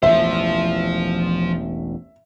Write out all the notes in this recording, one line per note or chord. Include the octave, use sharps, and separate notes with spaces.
E1 A1 E2 F3 C5 E5